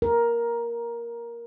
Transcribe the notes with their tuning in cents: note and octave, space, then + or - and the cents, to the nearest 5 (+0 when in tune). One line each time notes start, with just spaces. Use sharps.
A#4 +10